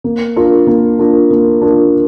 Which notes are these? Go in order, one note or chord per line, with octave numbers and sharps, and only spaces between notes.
A#3
D4 F4 A#4
A#3
D4 F4 A#4
A#3
D4 F4 A#4